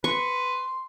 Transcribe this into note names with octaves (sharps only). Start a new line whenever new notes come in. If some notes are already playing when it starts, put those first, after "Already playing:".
B4 C6 C#6